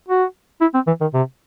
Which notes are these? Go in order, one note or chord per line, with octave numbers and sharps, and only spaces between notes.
F#4
E4
C4
E3
D#3
C3